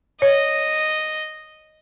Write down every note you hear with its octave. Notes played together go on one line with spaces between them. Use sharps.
C#5 D#5